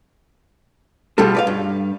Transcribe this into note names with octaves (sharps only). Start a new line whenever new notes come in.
B2 G3 G#3 F4 A4
B4 D5 F5
G2